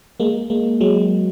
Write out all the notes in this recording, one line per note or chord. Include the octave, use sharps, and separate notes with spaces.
G#3 A#3
G#3 A#3
F#3 G#3